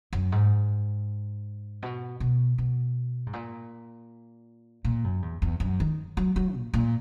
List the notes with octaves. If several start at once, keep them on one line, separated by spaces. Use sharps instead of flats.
F#2
G#2
B2
B2
B2
G#2
A#2
A#2
F#2
E2
E2
F#2
D#3
F#3
F#3
A#2
A#2